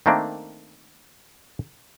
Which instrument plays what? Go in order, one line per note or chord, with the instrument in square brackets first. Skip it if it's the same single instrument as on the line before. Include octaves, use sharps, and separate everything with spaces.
[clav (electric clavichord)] D#3 A3 A#3 C4 D4